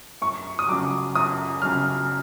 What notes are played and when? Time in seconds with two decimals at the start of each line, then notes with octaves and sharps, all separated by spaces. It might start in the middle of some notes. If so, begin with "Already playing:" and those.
0.22 F#2 C#6
0.59 D#6
0.68 C#3 F#3 D6
1.15 F#2 D#6
1.62 C#3 F#3 F6